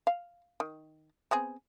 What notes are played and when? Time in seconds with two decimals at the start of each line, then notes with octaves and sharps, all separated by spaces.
0.07 F5
0.60 D#3
1.31 B3 C4 G#4